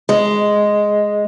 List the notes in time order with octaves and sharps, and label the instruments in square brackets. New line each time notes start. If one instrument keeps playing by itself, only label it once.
[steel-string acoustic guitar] G#3